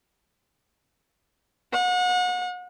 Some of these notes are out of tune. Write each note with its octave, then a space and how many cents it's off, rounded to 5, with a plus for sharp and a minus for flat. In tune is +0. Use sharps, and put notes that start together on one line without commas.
F#5 -35